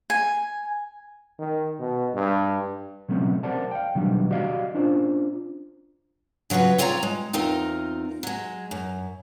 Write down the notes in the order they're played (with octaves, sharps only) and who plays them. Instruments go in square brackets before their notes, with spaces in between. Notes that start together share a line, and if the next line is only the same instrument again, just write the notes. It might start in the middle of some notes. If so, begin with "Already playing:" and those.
[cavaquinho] G#5
[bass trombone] D#3
B2
G2
[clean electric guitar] B2 F#3 A3 C4 C#4
G4 A#4 C5 D5 F#5 A5
F5 G5
B2 D3 D#3 F#3 G3
F#4 G4 D5 D#5 F5
C#4 D4 F4 C5
[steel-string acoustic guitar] C#3 F#3 F4 F#4 B4
C4 F4 C#5 D5 F#5 A#5
G#3
E2 C4 D#4 F4 A#4
F#3 G#3
F#2